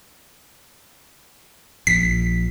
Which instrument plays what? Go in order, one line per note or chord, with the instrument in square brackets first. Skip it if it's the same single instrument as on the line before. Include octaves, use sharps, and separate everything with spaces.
[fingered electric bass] A#1 [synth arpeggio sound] B6